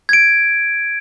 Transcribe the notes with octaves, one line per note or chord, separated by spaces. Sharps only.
G#6 D7